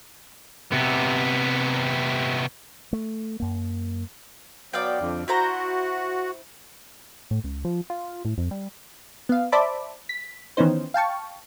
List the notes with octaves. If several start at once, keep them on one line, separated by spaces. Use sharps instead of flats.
C3 B3
A3
F#2 A#3
F#3 B3 D5 F5 G5
F2 D3
E4 F#4 C5 A#5
A2
C#2
F3
F4
A2
F2
G3
B3 F5
C5 D5 E5 A5 B5 D6
B6
D#3 E3 B3 C#4 D#4 C5
F5 G5 A5 C#6